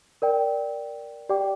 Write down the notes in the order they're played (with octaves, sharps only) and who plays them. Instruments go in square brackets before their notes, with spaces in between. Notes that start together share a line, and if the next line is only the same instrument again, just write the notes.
[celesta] A#4 D5 G5
G4 D5 G5 D6